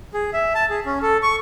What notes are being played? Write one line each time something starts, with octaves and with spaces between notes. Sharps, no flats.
G#4
E5
A5
G#4
C#4
A4
C#6